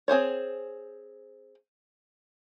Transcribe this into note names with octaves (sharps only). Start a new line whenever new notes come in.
C4 G#4 C5 C#5